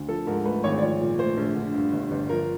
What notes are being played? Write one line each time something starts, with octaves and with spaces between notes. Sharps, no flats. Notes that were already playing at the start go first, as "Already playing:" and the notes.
Already playing: D2
F3 A4
G#2 A#4
A3 B4
G#1 C#5
D5
F3 C#5
A#2
A3 C5
A#1
D3
G2
G1
G1
F3 A#4